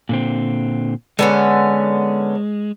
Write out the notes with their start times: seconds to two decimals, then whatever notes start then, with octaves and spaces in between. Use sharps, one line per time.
0.09 A#2 D3 C4
1.19 D3 G#3 B3 C#4